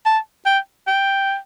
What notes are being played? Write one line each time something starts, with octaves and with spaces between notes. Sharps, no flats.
A5
G5
G5